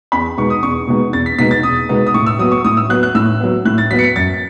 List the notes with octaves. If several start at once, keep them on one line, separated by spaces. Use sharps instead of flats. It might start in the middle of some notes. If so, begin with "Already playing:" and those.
E2 B5
B2 G#3 B3 D#4 C#6
D#6
E2 C#6
B2 G#3 B3 D#4
E2 A6
B6
B2 G#3 B3 D#4 B6
A6
E2 D#6
B2 G#3 B3 D#4
D#6
A2 C#6
E6
F#3 B3 D#6
C#6
A2 D#6
E6
F#3 B3 F#6
F#6
A2 E6
F#3 B3
A2 F#6
A6
F#3 B3 B6
C#7
B6
F#2 A6